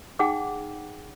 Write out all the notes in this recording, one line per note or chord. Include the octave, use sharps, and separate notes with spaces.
D#4 G#4 F#5 G5 D6